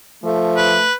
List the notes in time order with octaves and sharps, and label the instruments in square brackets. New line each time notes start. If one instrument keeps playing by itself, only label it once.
[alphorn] F3 [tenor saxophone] A3
[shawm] B4